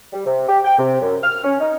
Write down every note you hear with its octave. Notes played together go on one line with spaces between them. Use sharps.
G3
C3
G4
G5
C3
F#2
F6
C#4
D#4